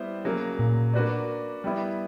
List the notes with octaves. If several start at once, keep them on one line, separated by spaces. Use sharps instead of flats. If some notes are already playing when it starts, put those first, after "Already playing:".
Already playing: G3 B3 E4 C5
C#3 F#3 A#3
A#2
A#3 D4 F#4 B4 D5
G3 B3 E4